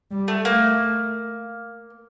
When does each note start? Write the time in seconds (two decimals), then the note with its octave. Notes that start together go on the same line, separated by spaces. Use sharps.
0.11 G3
0.28 A3
0.45 A3 A#3